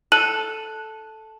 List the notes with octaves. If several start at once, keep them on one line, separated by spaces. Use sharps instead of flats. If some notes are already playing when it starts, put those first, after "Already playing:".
A4 F#6 D#7 F#7